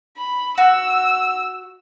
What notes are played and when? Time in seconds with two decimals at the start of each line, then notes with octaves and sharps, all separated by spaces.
0.17 B5
0.58 F#4 E6